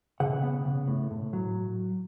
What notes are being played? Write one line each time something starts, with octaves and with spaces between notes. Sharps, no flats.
C#3 F#5
B3
C#3
A2
A2
F#3